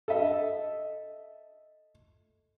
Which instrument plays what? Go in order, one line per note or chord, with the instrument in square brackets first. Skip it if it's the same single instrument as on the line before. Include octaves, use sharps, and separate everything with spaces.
[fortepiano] A4 D#5 E5